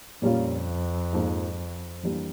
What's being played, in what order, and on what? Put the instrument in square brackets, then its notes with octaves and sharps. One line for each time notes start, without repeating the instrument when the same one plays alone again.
[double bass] F2 [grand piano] A#2 G3 A#3 C#4 F4
[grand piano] G#2 F3 A#3
E3 G3 A#3 D4